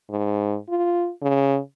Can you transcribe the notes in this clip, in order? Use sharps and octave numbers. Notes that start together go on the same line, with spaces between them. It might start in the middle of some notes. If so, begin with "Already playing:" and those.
G#2
F4
C#3